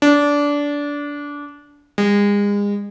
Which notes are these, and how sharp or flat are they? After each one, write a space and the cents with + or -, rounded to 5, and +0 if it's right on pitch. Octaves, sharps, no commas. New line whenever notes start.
D4 -20
G#3 -35